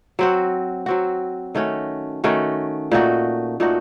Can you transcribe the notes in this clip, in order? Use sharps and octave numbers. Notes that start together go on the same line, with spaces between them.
F#3 C4 F#4
F#3 C4 F#4
D#3 A3 C#4 F#4
D#3 A3 C#4 F#4
A#2 A3 D#4 F#4
A#2 A3 D#4 F#4